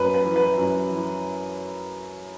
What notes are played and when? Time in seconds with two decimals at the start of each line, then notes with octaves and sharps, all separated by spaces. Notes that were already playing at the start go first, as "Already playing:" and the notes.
Already playing: F#2 B4
0.14 B4
0.25 E3
0.36 B4
0.58 F#2
0.90 E3